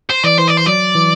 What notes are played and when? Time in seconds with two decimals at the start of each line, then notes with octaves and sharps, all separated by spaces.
0.11 C5
0.24 E3 D5
0.39 E3 C5
0.48 D5
0.58 C5
0.66 F#3 D5
0.95 E3